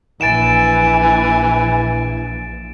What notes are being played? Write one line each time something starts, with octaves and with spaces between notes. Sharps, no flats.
A#1 E3 G#5 A6 D7 E7